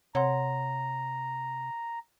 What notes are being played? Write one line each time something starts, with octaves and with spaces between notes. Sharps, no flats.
C3 C#5 F#5 A#5 C6